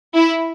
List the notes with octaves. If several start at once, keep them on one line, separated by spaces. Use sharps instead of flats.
E4